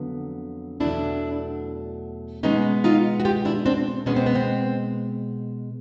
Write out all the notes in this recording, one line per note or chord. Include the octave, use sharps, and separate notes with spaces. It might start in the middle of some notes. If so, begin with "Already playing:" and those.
Already playing: F2 D3 F#3 B3
E2 B2 F#3 A3 D4 E4
B2 G#3 B3 C#4 D#4
D#4 F4
F#4
F4 G4
D4 E4
C4 D4
B2 G#3 B3 C#4
C4
B3
C4